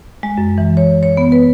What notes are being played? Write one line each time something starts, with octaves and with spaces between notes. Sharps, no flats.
G#3
F#2
E3
C#5
C#5
B3
B4